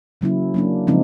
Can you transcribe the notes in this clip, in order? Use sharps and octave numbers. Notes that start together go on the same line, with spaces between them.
C#3 F#3 A#3 C#4 E4
F#3 A#3 D4
C#3 F3 G#3 C4 D#4